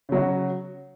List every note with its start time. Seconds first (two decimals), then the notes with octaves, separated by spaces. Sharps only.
0.09 C#3
0.12 F#3
0.15 F#4